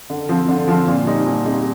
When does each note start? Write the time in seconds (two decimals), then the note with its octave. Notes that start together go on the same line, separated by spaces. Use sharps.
0.10 D3
0.29 F3 C4
0.48 D3
0.68 F3 C4
0.88 A#2
1.07 G3 C4 D#4
1.26 A#2
1.46 G3 C4 D#4